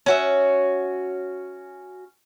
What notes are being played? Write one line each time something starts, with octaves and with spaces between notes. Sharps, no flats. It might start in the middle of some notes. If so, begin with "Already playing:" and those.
C#4 F#4 E5